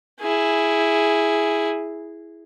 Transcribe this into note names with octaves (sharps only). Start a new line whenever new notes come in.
E4 G#4